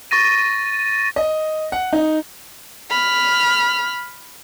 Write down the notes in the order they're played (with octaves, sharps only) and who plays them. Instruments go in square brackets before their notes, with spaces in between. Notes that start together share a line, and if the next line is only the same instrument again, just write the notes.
[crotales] C#6 A6 A#6 D#7
[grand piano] D#5
F#5
D#4
[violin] B5 F6